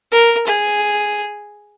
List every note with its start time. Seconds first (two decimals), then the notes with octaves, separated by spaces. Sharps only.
0.12 A#4
0.47 G#4